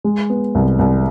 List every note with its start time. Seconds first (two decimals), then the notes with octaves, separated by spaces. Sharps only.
0.04 G#3
0.30 B3
0.55 C2
0.79 C2